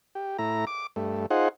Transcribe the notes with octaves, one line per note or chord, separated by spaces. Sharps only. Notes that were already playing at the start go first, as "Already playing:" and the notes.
G4
A2 E4 A#5
D6
G2 A3
D#4 F4 G#4 C5 F#5